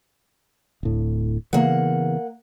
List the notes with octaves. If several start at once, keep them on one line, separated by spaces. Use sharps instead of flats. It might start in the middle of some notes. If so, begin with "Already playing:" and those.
D1 A2
C#3 E3 A#3 B3 F#5